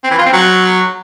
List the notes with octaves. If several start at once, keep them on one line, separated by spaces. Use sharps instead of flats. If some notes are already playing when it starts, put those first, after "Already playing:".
C4
E3
F4
C4
F#3